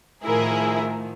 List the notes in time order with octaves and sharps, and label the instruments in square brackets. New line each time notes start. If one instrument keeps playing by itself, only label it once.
[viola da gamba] A2 D#3 F3 [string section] E4 G#4 A#4